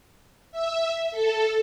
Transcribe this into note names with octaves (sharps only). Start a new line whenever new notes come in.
E5
A4